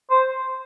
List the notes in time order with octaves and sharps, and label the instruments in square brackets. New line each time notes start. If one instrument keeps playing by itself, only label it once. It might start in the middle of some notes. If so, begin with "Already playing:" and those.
[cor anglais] C5